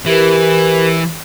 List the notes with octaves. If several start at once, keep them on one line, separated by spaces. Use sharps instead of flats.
E3 G4 A#4 B4